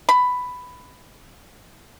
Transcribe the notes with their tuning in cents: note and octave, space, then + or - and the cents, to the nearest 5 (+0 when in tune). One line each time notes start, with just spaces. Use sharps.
B5 +10